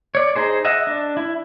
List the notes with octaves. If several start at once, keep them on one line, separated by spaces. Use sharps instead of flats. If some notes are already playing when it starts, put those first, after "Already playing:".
C#5 D5
D#4 G#4 C5
D#5 E5 F#5
D4
E4